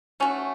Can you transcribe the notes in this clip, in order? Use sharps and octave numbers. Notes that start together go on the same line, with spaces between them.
A3 C#4 F#4